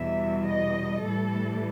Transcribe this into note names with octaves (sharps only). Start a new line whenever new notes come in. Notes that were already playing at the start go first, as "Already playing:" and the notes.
Already playing: E2 B2 G3 E5
D#5
A2 E3 G3 A4